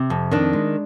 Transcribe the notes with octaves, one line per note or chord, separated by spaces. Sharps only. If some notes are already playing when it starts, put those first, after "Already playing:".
Already playing: C3
F2
D#3 D4
G#3